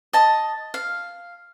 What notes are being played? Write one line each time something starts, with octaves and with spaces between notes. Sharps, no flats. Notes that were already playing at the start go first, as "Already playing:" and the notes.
D#5 A5
F5